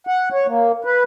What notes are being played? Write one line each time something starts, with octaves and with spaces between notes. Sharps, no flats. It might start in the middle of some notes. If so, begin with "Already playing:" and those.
F#5
C#5
A#3
B4